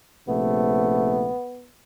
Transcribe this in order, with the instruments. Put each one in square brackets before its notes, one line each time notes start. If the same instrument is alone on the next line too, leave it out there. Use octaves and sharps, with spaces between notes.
[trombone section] A#1 C3 A3 [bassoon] B3